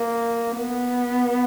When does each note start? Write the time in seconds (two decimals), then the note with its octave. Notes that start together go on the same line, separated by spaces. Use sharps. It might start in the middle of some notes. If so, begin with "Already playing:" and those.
Already playing: A#3
0.56 B3